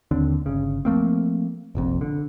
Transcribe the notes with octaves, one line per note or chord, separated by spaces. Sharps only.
D#2 D3 C4 D4
G1 C#3
F3 A3 A#3 C4
F1 A#1 F2
D3